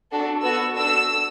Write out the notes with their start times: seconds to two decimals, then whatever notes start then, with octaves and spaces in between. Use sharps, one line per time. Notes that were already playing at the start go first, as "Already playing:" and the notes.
0.11 D4 F#4 A4
0.43 B3 F#4 A4 E6
0.76 D4 F#4 A4 E6